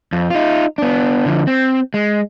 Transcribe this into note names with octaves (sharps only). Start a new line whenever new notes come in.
F2
D#4 F4
B3 D4
D3 F3
C4
G#3